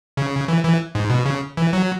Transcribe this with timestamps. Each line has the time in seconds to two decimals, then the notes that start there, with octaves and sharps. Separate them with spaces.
0.17 C#3
0.48 E3
0.64 E3
0.95 G#2
1.10 B2
1.26 C#3
1.57 E3
1.73 F#3